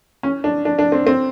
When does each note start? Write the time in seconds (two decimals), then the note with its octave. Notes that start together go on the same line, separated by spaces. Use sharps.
0.23 C#4
0.44 D4
0.65 D4
0.79 D4
0.92 C4
1.07 C4